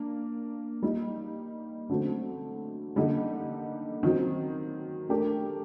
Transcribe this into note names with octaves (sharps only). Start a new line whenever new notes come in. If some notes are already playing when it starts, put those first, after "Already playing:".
Already playing: A#3 D4
G3 A#3 D#4
D3 F#3 A3 C4
D3 G3 A#3 D#4
D#3 F#3 C4
A3 D4 G4 A#4